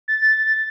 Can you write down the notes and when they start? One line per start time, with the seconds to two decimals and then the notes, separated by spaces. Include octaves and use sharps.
0.08 A6